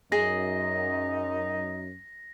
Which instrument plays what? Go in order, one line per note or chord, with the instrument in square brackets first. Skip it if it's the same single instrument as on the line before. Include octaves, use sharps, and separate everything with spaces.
[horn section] F#2 [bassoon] D#4 [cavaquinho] G#4 [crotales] A#6